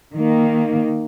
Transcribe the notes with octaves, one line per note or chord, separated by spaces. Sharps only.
D#3 A#3